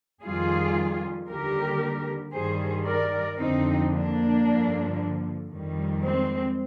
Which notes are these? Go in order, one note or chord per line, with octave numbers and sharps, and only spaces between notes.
F2 D#3 G3 F4 G#4
D#2 D3 G3 G4 A#4
G2 D#3 G3 G#4 C5
A#4 D5
F2 D3 F3 C4 D#4
A#3 D4
G2 D3 F3
F2 D#3 G3
G#3 C4